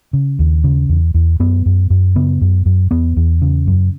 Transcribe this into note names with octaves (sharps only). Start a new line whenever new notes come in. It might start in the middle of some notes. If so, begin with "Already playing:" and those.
C#3
D#2
C#3
E2
E2
F#2 B3
F#2
F#2
C#3 B3
F#2
F#2
E2 B3
E2
C#3
F#2